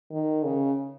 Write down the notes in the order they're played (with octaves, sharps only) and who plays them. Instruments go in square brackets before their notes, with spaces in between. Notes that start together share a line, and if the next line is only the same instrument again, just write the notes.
[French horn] D#3
C#3